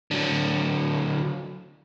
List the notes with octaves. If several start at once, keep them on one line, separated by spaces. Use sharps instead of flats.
D3 F#3